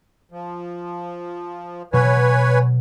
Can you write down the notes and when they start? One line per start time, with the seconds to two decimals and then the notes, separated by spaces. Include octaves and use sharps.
0.32 F3
1.93 B2 F#3 B4 C#5 G#5